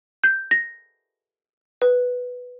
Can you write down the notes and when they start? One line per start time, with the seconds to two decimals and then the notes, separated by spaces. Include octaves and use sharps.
0.24 G6
0.51 A#6
1.82 B4